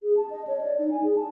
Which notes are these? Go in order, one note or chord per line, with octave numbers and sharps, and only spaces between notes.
G#4
A5
D#5
C#5
D5
D#4
G#5
G#4
A5